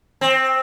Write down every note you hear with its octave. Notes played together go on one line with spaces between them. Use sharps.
C4